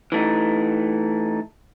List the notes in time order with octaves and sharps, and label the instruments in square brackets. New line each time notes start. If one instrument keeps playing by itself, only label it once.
[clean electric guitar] E3 A3 D#4